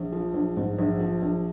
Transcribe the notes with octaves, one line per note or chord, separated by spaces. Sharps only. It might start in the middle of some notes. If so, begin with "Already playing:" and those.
Already playing: A#1
F3
A#1
G#2
A#1
F3
A#1